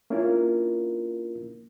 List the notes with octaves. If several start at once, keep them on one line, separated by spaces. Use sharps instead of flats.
A#3 C#4 D4 E4 F4 A#4